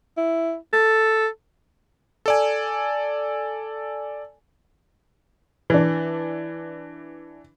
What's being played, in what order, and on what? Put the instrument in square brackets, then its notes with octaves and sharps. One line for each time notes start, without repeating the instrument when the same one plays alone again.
[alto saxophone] E4
A4
[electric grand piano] A4 D5 G#5
[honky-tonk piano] E3 D4